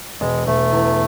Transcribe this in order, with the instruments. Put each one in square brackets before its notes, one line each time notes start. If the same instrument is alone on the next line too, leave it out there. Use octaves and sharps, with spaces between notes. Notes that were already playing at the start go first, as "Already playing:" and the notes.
[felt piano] E1 [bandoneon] G#3
[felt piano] E1 [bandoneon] A3
[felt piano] E2